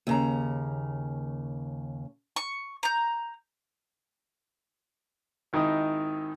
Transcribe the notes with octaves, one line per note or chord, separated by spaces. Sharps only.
D#2 C#3 A#5
C#6
A#5 G6
G#1 D#3 D#4 E4 D#5 D#6